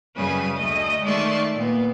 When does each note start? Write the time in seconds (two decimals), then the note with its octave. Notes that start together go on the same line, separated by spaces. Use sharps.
0.16 F#2 C#3 G3 B4 G#5 D#6
0.56 D2 A3 D#5
1.03 D#3 G#3 A3 D5 C6 C#6
1.55 A#2 B3